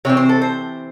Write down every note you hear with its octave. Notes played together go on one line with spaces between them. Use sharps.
C3 E3 C4 C#5
C5
A4
C5